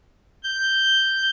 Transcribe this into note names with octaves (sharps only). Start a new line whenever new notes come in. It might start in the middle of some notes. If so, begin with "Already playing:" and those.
G6